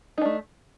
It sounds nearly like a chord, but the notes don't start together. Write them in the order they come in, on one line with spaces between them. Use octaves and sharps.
D#4 D4 A3